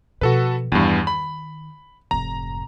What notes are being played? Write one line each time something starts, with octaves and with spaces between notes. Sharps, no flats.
B2 F3 F#4 A4 B4
E2 G2 D#3
B5
F1 G#2 A#5